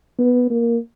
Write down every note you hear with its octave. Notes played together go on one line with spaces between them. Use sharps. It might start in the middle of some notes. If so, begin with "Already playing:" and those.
B3
A#3